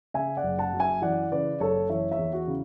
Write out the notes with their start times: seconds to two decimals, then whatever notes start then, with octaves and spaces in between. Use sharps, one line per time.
0.14 C#3 E5 G#5
0.37 D5 F#5
0.43 F#1
0.59 F#5 A5
0.73 F#2
0.80 E5 G#5
1.02 E3 D5 F#5
1.31 C#3 B4 D5
1.60 F#1 A4 C#5
1.90 E3 C#5 E5
2.12 C#5 E5
2.18 E2
2.33 F#4
2.47 C#3